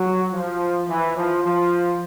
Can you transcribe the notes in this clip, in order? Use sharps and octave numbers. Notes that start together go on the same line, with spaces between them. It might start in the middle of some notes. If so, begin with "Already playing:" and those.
Already playing: F#3
F3
E3
F3
F3